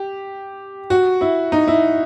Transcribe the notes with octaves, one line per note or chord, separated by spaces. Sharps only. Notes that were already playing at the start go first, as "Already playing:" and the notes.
Already playing: G4
F#4
E4
D#4
E4